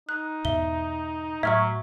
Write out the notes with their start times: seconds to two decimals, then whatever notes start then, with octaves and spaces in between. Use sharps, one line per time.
0.09 D#4 F#6
0.45 E2 G#2 B2 E5 G7
1.43 A2 F#3 E5 C#6 F6 G#6